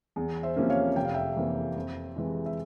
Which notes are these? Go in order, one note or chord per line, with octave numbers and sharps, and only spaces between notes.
E2
C5 E5
C3 F3 A#3 C#4
C#5 F5
F1 G5
F5
E5 G5
F2 E3 A#3
F2
C3 E3 G#3
E5